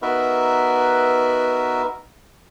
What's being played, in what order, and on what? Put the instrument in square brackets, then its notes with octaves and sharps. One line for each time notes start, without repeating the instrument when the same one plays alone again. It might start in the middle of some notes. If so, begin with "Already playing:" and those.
[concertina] B3 D#4 F#4 A#4 B4 E5